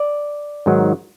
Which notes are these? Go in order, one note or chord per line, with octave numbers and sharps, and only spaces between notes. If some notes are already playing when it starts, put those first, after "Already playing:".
Already playing: D5
G#2 D#3 F#3